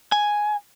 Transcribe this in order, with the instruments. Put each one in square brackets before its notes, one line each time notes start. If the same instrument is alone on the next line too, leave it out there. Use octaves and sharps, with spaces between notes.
[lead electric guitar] G#5